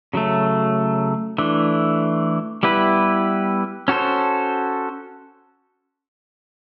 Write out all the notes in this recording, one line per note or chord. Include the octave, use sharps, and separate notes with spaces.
C#3 F#3 A3
E3 A3 D4
G3 B3 E4 G4 B4
C#4 F#4 A4 C5